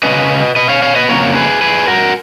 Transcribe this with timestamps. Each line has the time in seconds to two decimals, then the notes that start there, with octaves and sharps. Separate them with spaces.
0.03 C#3 G#3 C#4 B4 D#5
0.56 B4 D#5
0.69 C#5 F5
0.82 C#5 F5
0.95 B4 D#5
1.09 F2 C#3 F#3 A#3 A#4 C#5
1.35 G#4 B4
1.61 G#4 B4
1.88 F#4 A#4